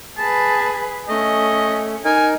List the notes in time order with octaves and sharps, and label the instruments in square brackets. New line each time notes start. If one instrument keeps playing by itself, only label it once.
[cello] G#4 B4 [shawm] A5
[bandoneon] A3 [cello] C#4 [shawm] D#5
[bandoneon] D#4 A#4 [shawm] G#5